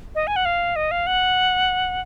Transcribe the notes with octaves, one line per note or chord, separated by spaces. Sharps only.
D#5
G#5
F#5
F5
D#5
F5
F#5